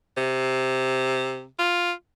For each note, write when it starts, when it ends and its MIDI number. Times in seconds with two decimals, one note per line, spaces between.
0.17 1.45 48
1.59 1.92 65